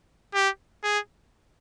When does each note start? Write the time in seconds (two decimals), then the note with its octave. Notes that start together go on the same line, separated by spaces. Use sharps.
0.34 G4
0.84 G#4